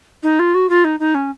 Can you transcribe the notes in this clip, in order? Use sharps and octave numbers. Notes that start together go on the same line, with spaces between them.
D#4
F4
F#4
F4
D#4
D#4
C#4